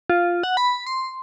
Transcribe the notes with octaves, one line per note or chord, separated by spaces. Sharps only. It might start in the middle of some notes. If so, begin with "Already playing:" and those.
F4
F#5
B5
C6